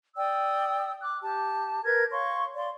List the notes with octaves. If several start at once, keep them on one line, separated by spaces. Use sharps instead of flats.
D5 G5 D#6 E6
D6 F#6
G4 A5
A#4 B4 G6 G#6
C#5 F5 C6 C#6
D5 F5 C6